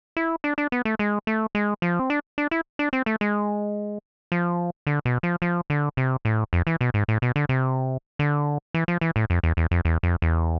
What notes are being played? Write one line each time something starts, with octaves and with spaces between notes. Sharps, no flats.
E4
D4
D4
B3
A3
G#3
A3
G#3
F3
C4
D4
D4
E4
D4
C4
A3
G#3
F3
D3
B2
F3
F3
D3
C3
A2
F2
E3
B2
G#2
A2
B2
D3
C3
D3
E3
F3
E3
A2
F2
E2
E2
F2
E2
F2
E2